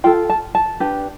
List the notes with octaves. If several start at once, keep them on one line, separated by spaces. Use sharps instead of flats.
F4 A4 G5
A5
A5
D4 G4 B4